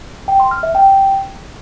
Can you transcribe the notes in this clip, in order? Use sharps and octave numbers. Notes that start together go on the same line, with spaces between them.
G5
C6
F6
E5
G5